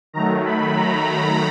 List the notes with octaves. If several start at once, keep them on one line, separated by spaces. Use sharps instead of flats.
D#3 F#3 A3 A#5
B5
A#5